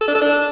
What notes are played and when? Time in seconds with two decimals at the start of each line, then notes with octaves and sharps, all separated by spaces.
0.01 A4
0.08 D4
0.15 A4
0.22 D4